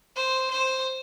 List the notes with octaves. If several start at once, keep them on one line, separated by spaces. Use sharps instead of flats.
C5
C5